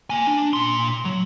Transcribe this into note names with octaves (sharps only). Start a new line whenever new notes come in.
A#3 G#5
D4
A#2 C6
F#3